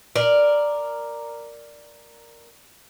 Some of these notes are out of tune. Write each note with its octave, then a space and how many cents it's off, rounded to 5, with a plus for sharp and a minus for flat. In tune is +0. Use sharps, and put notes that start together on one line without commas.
A#4 +0 D5 +0